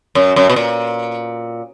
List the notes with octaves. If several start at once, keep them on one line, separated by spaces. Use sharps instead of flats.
F#2
F#2
B2
A#2